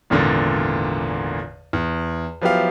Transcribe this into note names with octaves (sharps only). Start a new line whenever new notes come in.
G#1 E2 A#2 D3
E2
F3 F#3 B3 E4 G4 F5